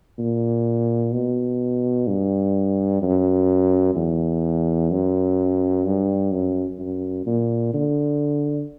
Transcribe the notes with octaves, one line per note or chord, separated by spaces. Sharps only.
A#2
B2
G2
F#2
E2
F#2
G2
F#2
F#2
A#2
D3